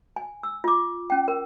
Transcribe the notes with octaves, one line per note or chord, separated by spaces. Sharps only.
G#5
E6
F4 D6
C#4 G5
A#4